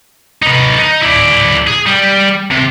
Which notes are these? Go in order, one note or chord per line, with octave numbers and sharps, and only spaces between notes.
D#4 B4
D#4
E4 D5
G#4
G3
C3